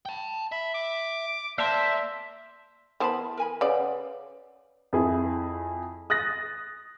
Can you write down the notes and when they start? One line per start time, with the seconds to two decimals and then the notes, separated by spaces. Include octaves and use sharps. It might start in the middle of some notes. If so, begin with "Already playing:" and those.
0.06 G5 A5
0.52 E5 B5
0.74 D6
1.58 A#3 C5 D5 E5 A5 C6
3.00 E3 B3 A#4 C5 A5 B5
3.37 A#4 G#5 B5
3.61 C#3 B4 C#5 D5 F#5
4.93 F2 E4 G#4
6.10 D#6 F#6 A6 A#6